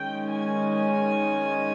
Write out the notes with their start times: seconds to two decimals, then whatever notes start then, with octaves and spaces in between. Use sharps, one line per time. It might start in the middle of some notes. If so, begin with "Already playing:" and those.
Already playing: D#3 G#3 C#4 G5
0.32 G#5
0.73 G#5